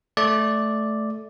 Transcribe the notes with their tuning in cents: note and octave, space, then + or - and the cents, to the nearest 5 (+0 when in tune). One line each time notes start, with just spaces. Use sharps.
A3 -10 D5 +0